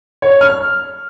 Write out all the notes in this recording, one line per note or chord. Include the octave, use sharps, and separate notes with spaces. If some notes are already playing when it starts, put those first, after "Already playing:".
C#5
F6